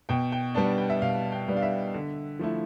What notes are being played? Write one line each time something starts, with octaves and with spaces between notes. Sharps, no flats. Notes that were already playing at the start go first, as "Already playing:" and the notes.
B2 G5
G5
G3 B3 D4 A5
G5
E5
B2 F5
G5
G3 B3 D4
F5
E5
D3
F3 A3 E4